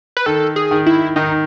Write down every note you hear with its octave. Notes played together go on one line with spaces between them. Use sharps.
B4
D#3 A4
G#4
D#3
E4
D#3 D#4